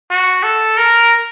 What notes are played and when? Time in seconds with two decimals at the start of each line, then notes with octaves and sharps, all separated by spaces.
0.11 F#4
0.43 A4
0.77 A#4